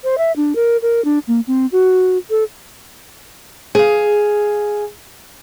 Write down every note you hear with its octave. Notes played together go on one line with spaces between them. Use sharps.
C5
E5
D4
A#4
A#4
D4
A#3
C4
F#4
A4
G#4 F5